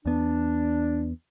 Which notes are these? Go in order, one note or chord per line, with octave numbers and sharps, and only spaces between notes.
E2 B3 D4